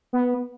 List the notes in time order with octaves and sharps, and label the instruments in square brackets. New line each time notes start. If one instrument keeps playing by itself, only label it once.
[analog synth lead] B3